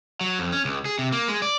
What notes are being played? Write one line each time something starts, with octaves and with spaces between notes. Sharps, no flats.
F#3
F2
C#4
C#2
G#4
C3
A#3
G#3
D5